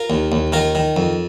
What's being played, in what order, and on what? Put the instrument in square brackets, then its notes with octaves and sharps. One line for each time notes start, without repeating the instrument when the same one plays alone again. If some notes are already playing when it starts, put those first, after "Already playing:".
Already playing: [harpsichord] F4 A#4
D#2
D#2
D#3 F4 A#4
D#3
F2